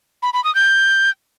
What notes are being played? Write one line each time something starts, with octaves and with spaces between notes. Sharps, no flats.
B5
B5
D#6
G6